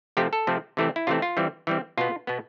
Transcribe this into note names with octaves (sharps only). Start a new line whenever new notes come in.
C3 F3 A3 C4 G4
A4
C3 F3 A3 C4
C3 E3 A3 C4
E4
C3 E3 A3 C4 F4
F4
E3 G3 C4
E3 G3 C4
B2 B3 F4
B2 B3